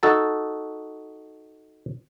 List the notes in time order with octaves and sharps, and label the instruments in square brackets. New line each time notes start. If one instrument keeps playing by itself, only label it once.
[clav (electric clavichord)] D#4 F#4 A4 A5